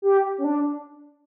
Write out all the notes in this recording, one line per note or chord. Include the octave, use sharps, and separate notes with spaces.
G4
C#4
D4